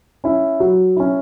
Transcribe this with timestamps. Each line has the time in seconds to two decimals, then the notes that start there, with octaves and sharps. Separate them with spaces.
0.24 C#4 E4
0.60 F#3
0.96 C#4 E4